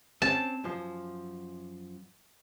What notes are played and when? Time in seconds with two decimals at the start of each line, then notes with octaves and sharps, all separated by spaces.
0.22 C4 C#4 A5
0.64 F#2 F3